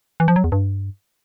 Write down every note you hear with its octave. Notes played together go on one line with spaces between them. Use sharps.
E3
F3
F#3
E2
G2